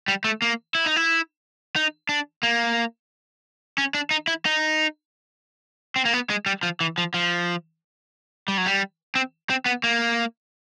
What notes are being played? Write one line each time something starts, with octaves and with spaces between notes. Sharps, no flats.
G3
A3
A#3
E4
D#4
E4
D#4
D4
A#3
C#4
D4
D#4
E4
D#4
C4
A#3
B3
G#3
G3
F3
E3
F3
F3
G3
F#3
G3
C4
C4
B3
A#3